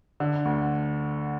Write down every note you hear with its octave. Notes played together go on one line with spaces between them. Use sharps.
D3
D2